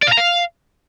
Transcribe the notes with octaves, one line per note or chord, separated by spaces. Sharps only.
D5
F5
A#5
F5